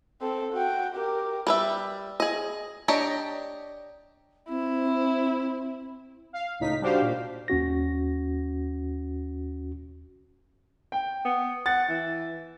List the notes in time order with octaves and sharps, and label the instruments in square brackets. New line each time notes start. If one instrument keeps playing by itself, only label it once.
[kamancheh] C4 A4
F#4 G5
G4 A#4
[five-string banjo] G3 B4 E5
G#4 D#5
D4 G4 C#5 D#5 A#5
[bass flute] C4 [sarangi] E4
[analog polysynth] F5
C#2 A2 D#4 B6
G3 D4 F#4 G4 C5 F5
A#2
[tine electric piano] D#2 C#4 F#4 A#6
[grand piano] G5
[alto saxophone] B3
[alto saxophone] F#5 [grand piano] A6
[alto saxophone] E3